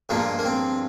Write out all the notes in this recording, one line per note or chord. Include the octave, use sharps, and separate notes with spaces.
G2 F3 G#3 A#3
A#3
C4